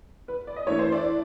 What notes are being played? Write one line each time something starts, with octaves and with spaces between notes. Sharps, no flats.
B4
D5
D#5
A2 E3 A3 D4 C#5
C5
D5